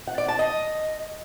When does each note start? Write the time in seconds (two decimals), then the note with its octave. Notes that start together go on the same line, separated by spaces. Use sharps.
0.07 F#5
0.18 D5
0.28 A5
0.39 D#5